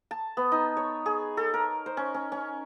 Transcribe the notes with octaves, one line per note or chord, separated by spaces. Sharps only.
A5
B3
D#4
C#5
G#4
A4
A#4
C5
C#4
C#4
C#4